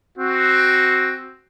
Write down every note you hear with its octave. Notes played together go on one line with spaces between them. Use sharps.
C4 F#4